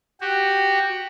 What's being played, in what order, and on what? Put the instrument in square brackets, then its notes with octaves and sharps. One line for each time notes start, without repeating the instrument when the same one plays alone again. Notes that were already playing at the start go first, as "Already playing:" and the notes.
[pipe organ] F#4 G4